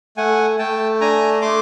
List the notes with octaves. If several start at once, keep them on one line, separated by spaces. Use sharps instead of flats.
A3 F#5 G#5
A3 G5 A5
D4 G#5 A#5
A3 C6 D6